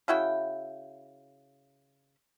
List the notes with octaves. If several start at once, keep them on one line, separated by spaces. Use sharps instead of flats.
C#3 E4 F#4 G5